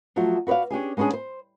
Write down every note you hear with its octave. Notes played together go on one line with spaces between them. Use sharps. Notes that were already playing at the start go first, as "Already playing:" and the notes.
F3 F#3 A3 F#4
F#4 B4 C#5 D5 F5
C#4 D4 G4 G#4
G#3 B3 C#4 D4 G#4
C5